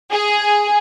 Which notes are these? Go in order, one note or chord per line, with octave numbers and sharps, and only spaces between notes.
G#4